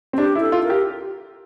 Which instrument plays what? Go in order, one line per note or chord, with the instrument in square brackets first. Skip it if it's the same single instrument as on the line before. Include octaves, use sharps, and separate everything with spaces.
[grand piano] C4
[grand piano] D4 [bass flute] G4
[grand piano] E4
[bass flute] A4
[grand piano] F4
[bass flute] A#4
[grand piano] G4